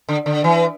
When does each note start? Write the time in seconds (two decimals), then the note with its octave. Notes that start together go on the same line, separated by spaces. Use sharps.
0.09 D3
0.26 D3
0.44 E3